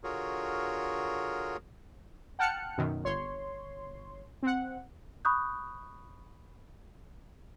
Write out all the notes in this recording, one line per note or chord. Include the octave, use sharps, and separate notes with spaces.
D3 F4 F#4 G#4 A#4 C#5
F#5 G5 A5 F6 F#6 C#7
F#2 B2 D#3
G1 C#5 C6
C4 F#5
B5 C#6 D#6 F#6 G6